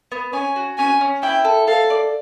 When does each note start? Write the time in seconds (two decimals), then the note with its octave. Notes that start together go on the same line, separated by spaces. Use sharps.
0.12 B3
0.33 C#4 G#5
0.56 F#4
0.78 C#4 G#5
1.01 C#4
1.23 E4 G5
1.45 A4
1.68 A4 F5
1.90 D5